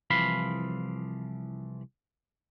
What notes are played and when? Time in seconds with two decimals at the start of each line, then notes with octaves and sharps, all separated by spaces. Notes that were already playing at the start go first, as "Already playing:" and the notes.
0.10 C2 E3 F3 F5 B5